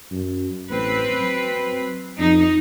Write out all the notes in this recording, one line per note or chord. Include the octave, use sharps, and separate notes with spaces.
F#2
A1 C4 B4
F#3
F2 D#4